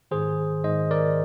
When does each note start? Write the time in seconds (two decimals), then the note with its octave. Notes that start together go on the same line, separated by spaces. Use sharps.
0.11 G#2 D#3 G#4 C5
0.64 G#2 D#3 C5 D#5
0.91 A#4 D5